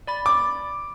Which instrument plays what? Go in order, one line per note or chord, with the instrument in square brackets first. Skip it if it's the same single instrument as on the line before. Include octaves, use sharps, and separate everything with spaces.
[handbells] D5 B5 A6
[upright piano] D6